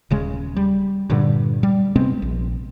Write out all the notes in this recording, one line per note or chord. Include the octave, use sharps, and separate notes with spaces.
D#1 C#3 G#3
G3
G2 A#2 D3
G3
C3 G#3 B3 C4
A#1